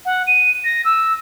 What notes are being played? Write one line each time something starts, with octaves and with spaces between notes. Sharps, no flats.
F#5
D#7
A#6
E6